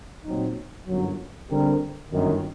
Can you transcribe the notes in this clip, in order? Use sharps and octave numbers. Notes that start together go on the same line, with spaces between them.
A#2 F#3 C4 D#4
G1 F#2 F#3
D3 G3 C4 G4 A#4
G1 F#2 D#3